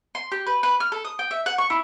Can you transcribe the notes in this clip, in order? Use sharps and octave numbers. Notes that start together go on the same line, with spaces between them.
C6
G4
B4
B4
F6
A4
D#6
G5
E5
F#5
C#6
E4